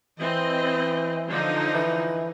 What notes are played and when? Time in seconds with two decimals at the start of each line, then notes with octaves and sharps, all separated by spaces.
0.20 E3 C4 D#5
1.29 D3 F3 D#4
1.74 E3